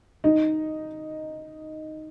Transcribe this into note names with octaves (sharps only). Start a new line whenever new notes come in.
D#4